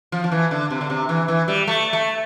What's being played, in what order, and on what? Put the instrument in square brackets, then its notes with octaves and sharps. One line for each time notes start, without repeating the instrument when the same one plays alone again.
[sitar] F3
F3
E3
D3
C3
D3
C3
E3
E3
G3
A3
A3